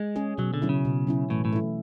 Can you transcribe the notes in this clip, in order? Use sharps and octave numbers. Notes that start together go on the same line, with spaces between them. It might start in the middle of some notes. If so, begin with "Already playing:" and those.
Already playing: G#3
C#4 G#4
B2 F#3
D3
F#3 C#4 E4
C#3
B2
F#3 C#4 E4
A2 E3
A2
A3 E4